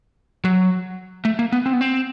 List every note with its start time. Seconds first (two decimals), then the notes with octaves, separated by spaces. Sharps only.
0.45 F#3
1.25 A3
1.39 A#3
1.52 B3
1.66 C4
1.73 B3
1.81 C4